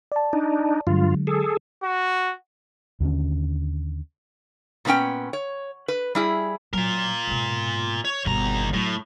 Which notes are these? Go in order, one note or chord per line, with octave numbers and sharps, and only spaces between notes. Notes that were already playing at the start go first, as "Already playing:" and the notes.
D5 A5
D4 D#4
G2 D3 F#3 G#3 F4
G#4 A4
F#4
D#2 D3 B3 C#4
A#2 E3 B3 C#4 G5
C#5
B4
G3 E4 G#4
F#3 F4 A#4
G#2 B2
C#5
G1 D#2 B2 A#5
A2 F#3